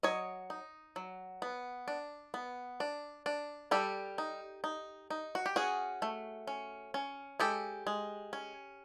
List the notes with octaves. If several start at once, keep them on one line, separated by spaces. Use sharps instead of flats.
F#3 C#5 D#5
D#4
F#3
B3
D4
B3
D4
D4
G3 G4 A4
D#4
D#4
D#4
F#4
G4
C#4 F#4 G#4
A3
C#4
C#4
G#3 G4 A4
G#3
C#4